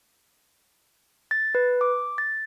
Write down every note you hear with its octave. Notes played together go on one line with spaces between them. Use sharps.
A6
B4
D6
A6